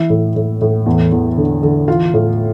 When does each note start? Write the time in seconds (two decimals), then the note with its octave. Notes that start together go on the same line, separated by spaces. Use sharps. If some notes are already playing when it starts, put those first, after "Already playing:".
Already playing: E3 E4 E5
0.10 A2
0.36 A2
0.61 A2
0.86 E2
1.12 E2
1.37 D3
1.63 D3
1.88 E3 F4 F5
2.14 A2